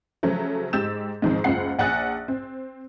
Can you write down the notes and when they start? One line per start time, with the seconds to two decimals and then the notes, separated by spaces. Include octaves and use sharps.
0.23 C#3 F3 F#3 A3
0.73 G#2 G4 E6 G6 A6 E7
1.22 G#2 D#3 F3 C4
1.44 F#1 C#2 F4 F#5 C7
1.78 A#1 F#5 G#5 F#6 A6
2.28 C4